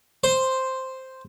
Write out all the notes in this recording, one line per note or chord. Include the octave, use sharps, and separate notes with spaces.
C5